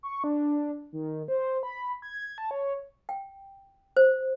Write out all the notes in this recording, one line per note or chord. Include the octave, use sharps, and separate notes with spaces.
C#6
D4
D#3
C5
B5
G#6
A5
C#5
G5
C5